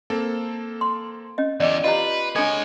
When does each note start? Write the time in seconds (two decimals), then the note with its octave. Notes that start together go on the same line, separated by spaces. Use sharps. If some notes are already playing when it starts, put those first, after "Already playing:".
0.10 A#3 C4 A4
0.81 C6
1.38 C#4 D#5
1.60 E2 G4 D5 D#5
1.84 F4 G4 B4 D#5 A#5
2.36 G#3 D4 A4 C#5 D#5 G#5 G#6